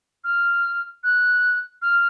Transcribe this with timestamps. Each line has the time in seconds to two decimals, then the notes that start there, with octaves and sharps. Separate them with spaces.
0.24 F6
1.04 F#6
1.82 F6